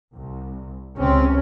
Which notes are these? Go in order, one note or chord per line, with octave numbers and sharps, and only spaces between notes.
C2
C#2 C3 C4 C#4